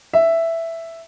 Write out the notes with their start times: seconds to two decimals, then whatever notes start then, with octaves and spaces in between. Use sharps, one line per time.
0.13 E5